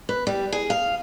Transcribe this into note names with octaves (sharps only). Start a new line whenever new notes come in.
B4
G3
G#4
F5